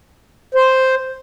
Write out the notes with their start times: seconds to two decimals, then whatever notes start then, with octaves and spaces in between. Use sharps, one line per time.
0.55 C5